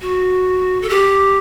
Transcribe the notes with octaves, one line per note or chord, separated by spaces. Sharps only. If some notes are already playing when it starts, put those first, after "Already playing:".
F#4
A4
G4